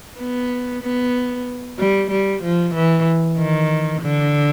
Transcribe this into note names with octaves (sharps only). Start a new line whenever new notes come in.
B3
B3
G3
G3
F3
E3
D#3
D3